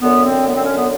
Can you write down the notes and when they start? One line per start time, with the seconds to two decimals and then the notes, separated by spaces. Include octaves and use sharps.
0.02 F#2 D3 B3
0.23 C4
0.47 B3
0.55 C4
0.65 C#4
0.76 B3